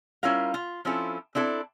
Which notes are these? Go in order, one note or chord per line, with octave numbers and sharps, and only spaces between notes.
G3 C#4 E4 F4 A#4 F5
F4
F3 C4 C#4 E4 F4 A4
C4 D4 E4 A4